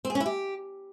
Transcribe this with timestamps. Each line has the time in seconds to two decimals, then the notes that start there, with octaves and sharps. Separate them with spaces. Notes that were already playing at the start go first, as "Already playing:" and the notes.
0.05 C4
0.10 G#4
0.15 C#4
0.20 E4
0.26 G4